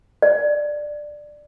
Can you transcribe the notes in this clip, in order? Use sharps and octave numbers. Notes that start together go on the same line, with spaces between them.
D5